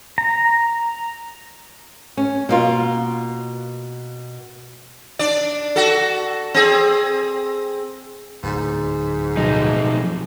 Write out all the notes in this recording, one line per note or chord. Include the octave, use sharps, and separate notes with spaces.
A#5
C#4
B2 A#3 F4
D4 D5
F#4 A4
C4 G#4
D1 G#2
B1 F2 D#4